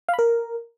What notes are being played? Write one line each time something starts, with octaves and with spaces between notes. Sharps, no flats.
F5
B5
A#4